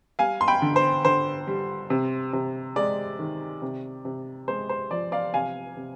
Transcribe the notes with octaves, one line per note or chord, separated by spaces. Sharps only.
G3 F5 G#5
C6
G5 B5
D3
C5
D3 C5
G3
C3
C3
G#3 D5
D#3
C3
C3
G#3 C5
C5
F3 D5
D5 F5
C3 F5 G#5
C3